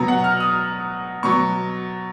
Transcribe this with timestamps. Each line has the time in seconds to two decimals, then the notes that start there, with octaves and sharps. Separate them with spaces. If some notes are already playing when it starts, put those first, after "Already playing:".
Already playing: B2 F#3 A#5
0.08 F#5
0.24 F6
0.40 D#6
1.23 B2 F#3 C#6